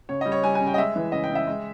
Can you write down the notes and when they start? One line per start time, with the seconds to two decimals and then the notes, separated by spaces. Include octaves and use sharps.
0.09 C#3 C#5
0.21 G3 D#5
0.32 C#5
0.44 G3 G#5
0.55 G#5
0.61 C#3
0.67 G5
0.74 D#5
0.78 G#3 E5
0.96 E3
1.12 C#3 D#5
1.24 G5
1.30 C#3
1.35 E5
1.47 G#3